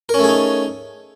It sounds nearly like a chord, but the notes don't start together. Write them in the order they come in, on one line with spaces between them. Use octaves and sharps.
A#4 C#4 A3 G#4 D#4